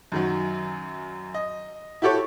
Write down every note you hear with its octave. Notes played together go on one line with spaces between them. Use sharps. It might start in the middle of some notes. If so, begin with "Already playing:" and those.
F#2 D#3 F#3
D#5
E4 F#4 G4 A4 C#5